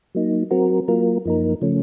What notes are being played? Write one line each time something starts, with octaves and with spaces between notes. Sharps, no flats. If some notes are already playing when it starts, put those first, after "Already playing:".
F#3 A#3 D#4
F#3 C4 F#4 A#4
F#3 A#3 F4 A#4
F#2 F3 A#3 D#4 A#4
C#3 F3 A3 C#4